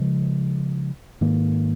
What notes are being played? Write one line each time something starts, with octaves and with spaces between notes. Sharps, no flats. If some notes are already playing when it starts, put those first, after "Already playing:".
Already playing: C#3 F3 G#3
G#2 D#3 A#3